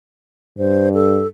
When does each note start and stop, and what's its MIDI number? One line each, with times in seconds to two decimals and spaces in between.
0.58 1.24 43
0.58 0.89 72
0.94 1.27 69